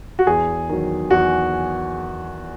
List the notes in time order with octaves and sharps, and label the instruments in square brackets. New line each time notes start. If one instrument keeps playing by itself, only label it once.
[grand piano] F#4
E2 G#4
D#3 F#3
E2 F#4